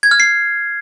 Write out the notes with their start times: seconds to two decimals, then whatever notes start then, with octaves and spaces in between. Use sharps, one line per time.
0.03 G#6
0.11 F6
0.20 C7